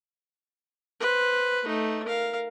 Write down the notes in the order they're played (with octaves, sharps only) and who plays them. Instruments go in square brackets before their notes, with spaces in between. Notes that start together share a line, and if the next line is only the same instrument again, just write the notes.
[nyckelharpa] B4 C5
A3 D#4
A#4 F5